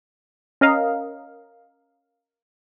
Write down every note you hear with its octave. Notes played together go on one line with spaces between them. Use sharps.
C#4 A#4 D#5 F5